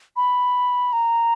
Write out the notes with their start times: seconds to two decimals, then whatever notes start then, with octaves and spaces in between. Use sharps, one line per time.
0.16 B5
0.93 A#5